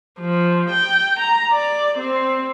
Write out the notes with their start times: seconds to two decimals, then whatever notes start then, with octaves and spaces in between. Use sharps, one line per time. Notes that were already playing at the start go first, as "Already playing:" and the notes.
0.19 F3
0.71 G5
1.20 A#5
1.52 D5
1.99 C4